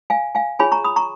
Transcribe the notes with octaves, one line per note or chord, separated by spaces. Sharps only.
F5 G#5
F5 G#5
F4 G#4 C#5 G#5 B5
A#5 C#6
B5 D#6
A#5 C#6